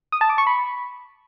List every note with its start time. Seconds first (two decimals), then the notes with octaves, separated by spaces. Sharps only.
0.12 D#6
0.21 A5
0.30 D6
0.38 C#6
0.47 B5